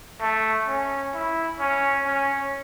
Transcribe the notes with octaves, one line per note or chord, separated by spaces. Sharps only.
A3
C#4
E4
C#4
C#4